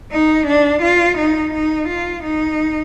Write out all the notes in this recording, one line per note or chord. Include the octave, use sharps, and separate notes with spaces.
D#4
D4
F4
D#4
D#4
F4
D#4